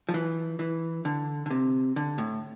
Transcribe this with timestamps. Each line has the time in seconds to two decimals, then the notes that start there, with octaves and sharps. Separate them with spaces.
0.09 F3
0.14 E3
0.59 E3
1.05 D3
1.46 D3
1.51 C3
1.96 D3
2.18 A2